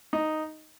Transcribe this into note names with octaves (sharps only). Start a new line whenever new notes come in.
D#4